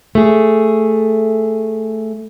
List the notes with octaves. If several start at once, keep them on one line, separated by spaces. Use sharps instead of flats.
A3 G#4